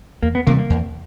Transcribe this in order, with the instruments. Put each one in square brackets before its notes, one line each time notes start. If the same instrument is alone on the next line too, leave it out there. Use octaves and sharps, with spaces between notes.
[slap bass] E2 [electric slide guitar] A#3
[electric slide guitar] B3
[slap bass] C3 E3 G3 [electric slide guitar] A#3
[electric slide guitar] A#3
[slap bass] E2